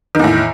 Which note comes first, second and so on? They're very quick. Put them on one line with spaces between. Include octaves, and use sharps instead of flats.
D#3 E2 A2